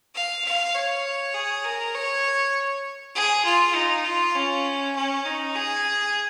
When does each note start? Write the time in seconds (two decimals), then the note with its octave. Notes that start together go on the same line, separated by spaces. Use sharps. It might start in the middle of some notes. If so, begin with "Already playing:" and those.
0.14 F5
0.44 F5
0.75 C#5
1.34 G#4
1.65 A#4
1.95 C#5
3.15 G#4
3.45 F4
3.75 D#4
4.05 F4
4.35 C#4
4.96 C#4
5.25 D#4
5.56 G#4